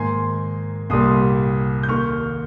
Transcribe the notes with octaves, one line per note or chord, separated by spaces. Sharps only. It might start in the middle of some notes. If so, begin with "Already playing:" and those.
Already playing: G#2 D#3 A#3 G#5 C6
C2 A#2 G3 A#3 C6 D#6
G6
D#2 D#3 A#3 C#6 F6